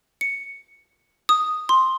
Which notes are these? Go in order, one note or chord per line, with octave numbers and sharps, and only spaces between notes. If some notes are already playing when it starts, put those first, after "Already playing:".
C#7
D#6
C6